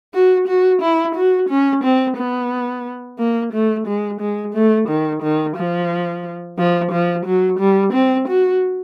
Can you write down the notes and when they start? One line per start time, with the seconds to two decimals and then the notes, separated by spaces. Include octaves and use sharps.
0.14 F#4
0.48 F#4
0.81 E4
1.15 F#4
1.49 C#4
1.84 C4
2.17 B3
3.19 A#3
3.53 A3
3.87 G#3
4.21 G#3
4.54 A3
4.88 D#3
5.22 D#3
5.56 F3
6.58 F3
6.91 F3
7.26 F#3
7.59 G3
7.93 C4
8.28 F#4